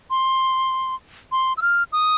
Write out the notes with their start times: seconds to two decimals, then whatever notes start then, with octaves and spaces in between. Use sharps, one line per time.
0.10 C6
1.32 C6
1.57 E6
1.62 F6
1.93 D#6